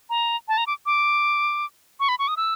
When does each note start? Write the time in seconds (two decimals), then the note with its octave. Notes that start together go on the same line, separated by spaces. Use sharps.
0.10 A#5
0.48 A5
0.58 A#5
0.67 D6
0.86 D6
2.00 C#6
2.09 B5
2.19 C#6
2.28 D#6
2.37 E6